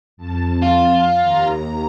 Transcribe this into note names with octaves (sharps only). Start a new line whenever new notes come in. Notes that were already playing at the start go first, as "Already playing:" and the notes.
F2 A5
F4
D#2 A#5